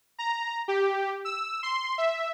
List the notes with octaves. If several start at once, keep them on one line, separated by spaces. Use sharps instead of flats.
A#5
G4
E6
C6
E5